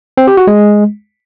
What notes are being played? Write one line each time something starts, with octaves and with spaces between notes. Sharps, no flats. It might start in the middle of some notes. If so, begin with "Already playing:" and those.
C4
G4
F#4
G#3